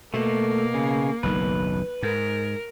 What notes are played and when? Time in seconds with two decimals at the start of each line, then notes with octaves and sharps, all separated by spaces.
0.14 B2 A3 A#3
0.74 C#3
1.23 F#1 B1 D#3 B4
2.03 G#2 A#4